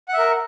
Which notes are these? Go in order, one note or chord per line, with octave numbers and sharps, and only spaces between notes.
A#4 E5 F#5